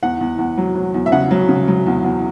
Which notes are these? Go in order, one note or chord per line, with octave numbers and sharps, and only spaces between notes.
E2 F#5
E2
E2
F#3
F#3
E2
E5
C#3 F#5
F#3
C#3
F#3
E2
E2